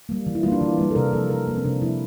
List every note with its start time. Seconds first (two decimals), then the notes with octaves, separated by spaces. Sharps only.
0.09 G3 A#3
0.27 E3
0.35 E4
0.43 G3 A#3 F4
0.52 D4
0.61 E3
0.78 G3 A#3
0.91 A4
0.95 C3 A#4
1.13 F3 A#3 A4
1.30 C3 A#4
1.48 F3 A#3
1.56 C4
1.65 C3 D4
1.82 F3 A#3 E4